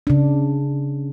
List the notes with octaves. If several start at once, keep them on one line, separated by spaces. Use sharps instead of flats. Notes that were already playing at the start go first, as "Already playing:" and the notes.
C#3 D4